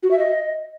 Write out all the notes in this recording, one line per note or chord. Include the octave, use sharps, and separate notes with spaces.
F#4
E5
D#5